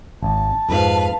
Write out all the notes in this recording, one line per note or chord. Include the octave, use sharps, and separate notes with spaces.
G#1 A5
F2 G#2 B4 F5